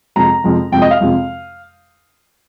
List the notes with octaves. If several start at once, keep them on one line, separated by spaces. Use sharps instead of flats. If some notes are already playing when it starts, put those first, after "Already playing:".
F2 C3 F3 G#3 A#5
F2 C3 F3 G#3
F2 C3 F3 G#3 G5
D#5
F5
F2 C3 F3 G#3